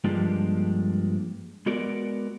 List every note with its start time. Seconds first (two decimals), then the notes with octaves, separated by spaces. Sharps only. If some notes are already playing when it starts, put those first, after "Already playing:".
0.04 G2 F3 G#3 A#3 D4 G4
1.66 G#3 B3 F#4 A#4 D5